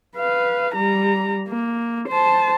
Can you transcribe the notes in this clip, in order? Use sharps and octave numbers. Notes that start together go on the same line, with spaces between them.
B4 F5
G3 A#5
A#3
C5 A5